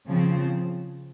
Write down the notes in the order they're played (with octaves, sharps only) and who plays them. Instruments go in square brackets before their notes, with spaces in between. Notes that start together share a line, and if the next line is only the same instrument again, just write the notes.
[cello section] C#3 F3 C4